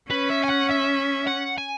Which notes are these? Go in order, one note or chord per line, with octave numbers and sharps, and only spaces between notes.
C#4 B4
E5
G#5
F#5
E5
F#5
G#5